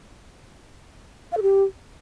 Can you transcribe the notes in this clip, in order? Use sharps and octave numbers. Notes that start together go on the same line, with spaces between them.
F5
A4
G4